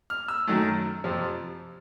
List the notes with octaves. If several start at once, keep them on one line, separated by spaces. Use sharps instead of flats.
F6
E6
F#2 D#3 F#3 A3
F2 C3 F3